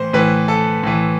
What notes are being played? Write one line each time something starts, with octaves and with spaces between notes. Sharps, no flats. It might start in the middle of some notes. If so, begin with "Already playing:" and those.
Already playing: A2 E3 C5
A2 E3 B4
A4
A2 E3